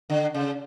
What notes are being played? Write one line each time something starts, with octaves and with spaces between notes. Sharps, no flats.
D3
C#3